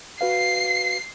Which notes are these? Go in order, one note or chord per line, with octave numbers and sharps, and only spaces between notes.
F#4 B4 F5 C7